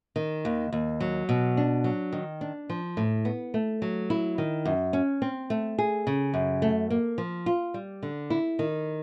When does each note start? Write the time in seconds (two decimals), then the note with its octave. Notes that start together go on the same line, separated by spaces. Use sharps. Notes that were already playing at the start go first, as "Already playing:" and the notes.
0.16 D#3
0.45 D#2
0.73 D#2
1.00 F#3
1.29 B2
1.57 D4
1.84 F#3
2.12 D#3
2.41 D4
2.70 F3
2.97 A2
3.25 B3
3.54 A3
3.82 F#3
4.10 E4
4.38 D#3
4.65 F#2
4.93 C#4
5.22 C4
5.50 A3
5.78 G#4
6.07 C#3
6.34 F#2
6.62 A3
6.90 A#3
7.18 F3
7.46 F4
7.74 G3
8.03 D3
8.30 E4
8.59 D#3